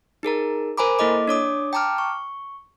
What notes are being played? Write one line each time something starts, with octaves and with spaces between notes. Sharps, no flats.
D#4 G#4 A#4 A#5
A#4 C5 G#5 A#5 B5 D6
A#3 E4 A4 D#5 D6
D4 C#5 D6 D#6
G5 A5 A#5 D6 F6
C#6